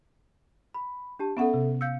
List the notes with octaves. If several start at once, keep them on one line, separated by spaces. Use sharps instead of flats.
B5
D4 G4 A5
B3 C#4 A4 E5 F#5
C3
F5 E6 G6 C#7